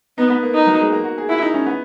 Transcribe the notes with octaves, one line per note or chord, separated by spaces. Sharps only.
B3 D#4
B3
A#3
D#4
F#3
G#3
A#3
F#4
G#4
E4 F#4
D#4
C#4
B3